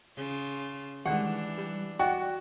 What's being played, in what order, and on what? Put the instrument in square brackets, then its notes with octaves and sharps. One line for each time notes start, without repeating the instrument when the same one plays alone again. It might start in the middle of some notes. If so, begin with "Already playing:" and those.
[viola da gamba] C#3 F4
[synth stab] D#3 G3 G#3 [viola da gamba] E3 D4 [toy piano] G4 D5 [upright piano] F#5
[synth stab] G3
[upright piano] F#4 [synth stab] D5 [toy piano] D#5 G5 C#6